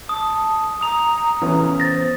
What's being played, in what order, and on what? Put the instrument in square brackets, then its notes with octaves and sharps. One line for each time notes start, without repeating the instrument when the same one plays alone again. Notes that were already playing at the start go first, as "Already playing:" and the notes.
[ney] A5 [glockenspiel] D#6
[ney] A#5 [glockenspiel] D#6 F7
[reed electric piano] E3 B3 C#4
[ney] C5 [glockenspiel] A6 A#6